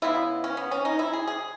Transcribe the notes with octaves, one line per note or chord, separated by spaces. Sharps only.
C#3 G#3 B3 E4
C#4
B3
C#4
D#4
E4
G#4
G#4